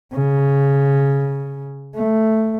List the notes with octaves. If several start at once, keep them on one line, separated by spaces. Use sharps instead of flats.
C#3
A3